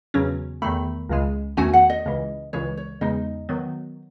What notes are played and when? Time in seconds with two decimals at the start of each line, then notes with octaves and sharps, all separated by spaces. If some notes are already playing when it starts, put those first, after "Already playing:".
0.14 E2 C#3 F#3 C#4
0.62 E2 D#3 A3 B5
1.09 C#2 C#3 G#3
1.57 E2 D#3 A3 C#4 F#4 G#5
1.73 F#5
1.90 D#5
2.06 C#2 C#3 E3
2.53 C#2 C#3 E3 G#3 C#5
2.77 C#5
3.01 E2 C#3 G#3 D#4 D#5
3.49 D#3 F#3 B3